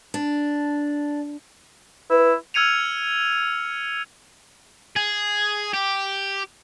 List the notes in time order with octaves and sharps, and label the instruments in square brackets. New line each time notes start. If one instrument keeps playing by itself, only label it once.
[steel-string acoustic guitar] D4
[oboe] E4 [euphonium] B4
[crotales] E6 F6 G#6 C#7 D#7 F7
[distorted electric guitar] G#4
G4